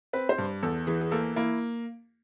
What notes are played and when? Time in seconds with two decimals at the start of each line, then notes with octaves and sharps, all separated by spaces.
0.13 C4 B4
0.29 C5
0.38 G2
0.63 E2 A4
0.87 E3 G#4
1.01 G#4
1.11 A#3 A4
1.36 A#3 E4